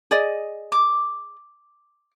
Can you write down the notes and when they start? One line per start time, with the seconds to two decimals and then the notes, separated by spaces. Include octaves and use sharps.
0.11 G#4 D5 D#5
0.72 D6